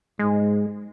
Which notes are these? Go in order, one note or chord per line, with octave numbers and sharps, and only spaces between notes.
G#2 G#3